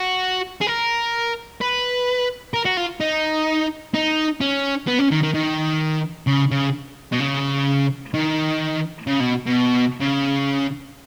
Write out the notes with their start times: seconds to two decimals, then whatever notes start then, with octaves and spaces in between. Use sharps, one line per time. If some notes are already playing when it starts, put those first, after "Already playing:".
Already playing: F#4
0.61 G#4
0.67 A#4
1.61 B4
2.54 A#4
2.65 F#4
2.77 F4
3.01 D#4
3.94 D#4
4.41 C#4
4.87 B3
4.99 C#4
5.11 D#3
5.23 D#3
5.34 D#3
6.27 C#3
6.51 C#3
7.12 B2
7.20 C#3
8.14 D#3
9.07 C#3
9.20 B2
9.47 B2
10.00 C#3